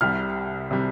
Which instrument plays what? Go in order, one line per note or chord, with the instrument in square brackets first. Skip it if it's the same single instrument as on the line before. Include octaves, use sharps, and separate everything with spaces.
[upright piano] C2 C3 G3 F6
C3 G3